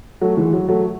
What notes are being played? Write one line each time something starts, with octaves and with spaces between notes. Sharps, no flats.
F#3 A3
E3 G#3
F#3
F#3 A3